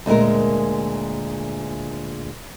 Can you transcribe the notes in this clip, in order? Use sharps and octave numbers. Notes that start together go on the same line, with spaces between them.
D2 A#2 D3 G#3 A#4